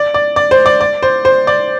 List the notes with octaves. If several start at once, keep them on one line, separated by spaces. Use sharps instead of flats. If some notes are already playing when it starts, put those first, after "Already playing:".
Already playing: D5
D5
D5
C5
D5
D5
C5
C5
D5